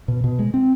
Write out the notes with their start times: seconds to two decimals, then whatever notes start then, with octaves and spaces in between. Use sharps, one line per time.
0.08 B2
0.24 B2
0.39 G#3
0.54 C4